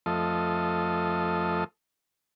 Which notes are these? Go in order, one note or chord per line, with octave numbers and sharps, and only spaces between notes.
F2 F3 A3 A4 D#5 C6